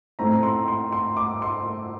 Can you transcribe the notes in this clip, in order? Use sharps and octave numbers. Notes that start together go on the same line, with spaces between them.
A2 A3 C4 A#5
C6
C6
C6
D6
C6